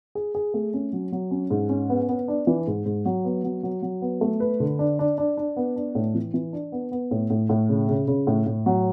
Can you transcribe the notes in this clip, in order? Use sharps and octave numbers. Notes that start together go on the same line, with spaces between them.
G#4
G#4
A3
C#4
F#3
F#3
C#4
G#2
C#4
B3
B3
D4
E3
G#2
G#2
F#3
B3
F#3
F#3
F#3
B3
A3
B4
D3
D4
D4
D4
D4
B3
D4
A2
E3
E3
D4
B3
B3
A2
A2
A2
C#3
C#3
C#3
A2
A2
F#3